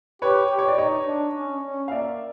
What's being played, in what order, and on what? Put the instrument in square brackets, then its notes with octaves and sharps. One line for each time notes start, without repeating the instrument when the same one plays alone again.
[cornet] G4 [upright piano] B4 C#5
[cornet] G4
[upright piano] C#5
D5
[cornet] D#4 [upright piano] C#5 D#5
[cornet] D4
C#4
C#4
[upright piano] F5
[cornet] A#3 [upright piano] D5 E5